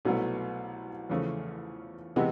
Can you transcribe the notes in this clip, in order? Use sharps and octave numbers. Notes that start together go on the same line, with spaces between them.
C2 B2 F#3 A3
E2 C#3 F3 A3
C3 E3 G#3 B3